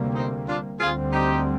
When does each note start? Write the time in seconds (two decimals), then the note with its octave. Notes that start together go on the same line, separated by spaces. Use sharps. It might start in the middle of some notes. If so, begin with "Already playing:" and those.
Already playing: D2 C3 G3 A#3
0.15 C4 D#4
0.48 D4 F4
0.80 D2 D3 G3 C4 F4 G#4
1.12 D#4 G4